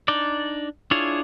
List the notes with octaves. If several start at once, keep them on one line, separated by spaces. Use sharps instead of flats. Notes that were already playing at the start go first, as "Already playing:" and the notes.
D4 D#4 D5
D4 E4 F4 G#4 C#5